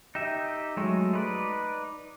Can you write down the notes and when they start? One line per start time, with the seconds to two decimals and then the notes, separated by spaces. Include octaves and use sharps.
0.15 D#4 G4 E5
0.77 F#3 G#3 A3
1.13 D#4 B4 D5